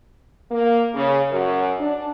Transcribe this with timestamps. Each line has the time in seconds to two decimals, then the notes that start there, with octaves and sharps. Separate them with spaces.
0.51 A#3
0.95 C#3
1.31 F#2
1.79 D4